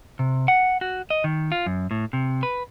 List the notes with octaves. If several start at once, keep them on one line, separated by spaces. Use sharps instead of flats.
C3
F#5
F#4
D#5
D#3
F4
F#2
A2
C3
B4